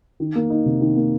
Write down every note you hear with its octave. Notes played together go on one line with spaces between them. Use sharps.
D#3
A#3
D#4
C3
D#3
A#3